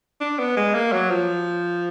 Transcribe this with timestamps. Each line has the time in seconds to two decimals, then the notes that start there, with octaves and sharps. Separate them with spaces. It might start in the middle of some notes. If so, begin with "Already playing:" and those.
0.21 D4
0.39 B3
0.57 G#3
0.75 A#3
0.93 F#3
1.11 F3